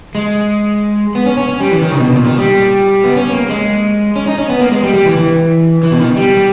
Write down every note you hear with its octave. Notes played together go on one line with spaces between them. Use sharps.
G#3
B3
C#4
C#4
C#4
G3
E3
D#3
C#3
B2
A#2
D#3
G3
B3
C#4
A#3
G#3
C#4
D#4
C#4
B3
A#3
G#3
G3
G3
E3
E3
E3
B2
D#3
G3